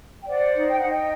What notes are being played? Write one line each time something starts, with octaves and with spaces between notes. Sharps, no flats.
G5
C5 D5 F#5
D#4
G5
D#4 F#5
D#5 G5